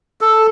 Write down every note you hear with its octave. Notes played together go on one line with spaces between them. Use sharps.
A4